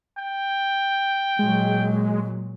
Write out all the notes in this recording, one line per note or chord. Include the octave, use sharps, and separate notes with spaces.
G5
A#2 F#3 G#3